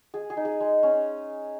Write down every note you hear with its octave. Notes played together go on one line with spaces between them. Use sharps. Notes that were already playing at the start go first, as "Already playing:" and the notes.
G#3 G#4
G#4
D#4
G#4
G#3
C#4